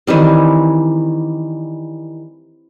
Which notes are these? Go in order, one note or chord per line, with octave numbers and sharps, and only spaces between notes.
D#3 E3 G3 C4